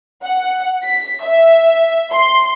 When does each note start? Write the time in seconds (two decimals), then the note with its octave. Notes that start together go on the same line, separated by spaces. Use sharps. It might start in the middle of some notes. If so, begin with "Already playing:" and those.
0.24 F#5
0.84 B6
1.24 E5
2.12 C6